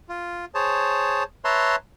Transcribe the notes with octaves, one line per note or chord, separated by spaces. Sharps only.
F4
G#4 C5 C#5 A5
B4 C#5 E5 A5 A#5 C6